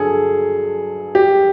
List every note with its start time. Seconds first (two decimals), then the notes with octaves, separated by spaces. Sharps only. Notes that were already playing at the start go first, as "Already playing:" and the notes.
Already playing: G2 D3 F#3 G#4 A4
1.15 G4